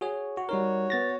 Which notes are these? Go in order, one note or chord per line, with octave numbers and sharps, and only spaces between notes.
F#4 G#4 C#5
F#4
G3 D#4 F#4 A#4 C#5
B3 A6 A#6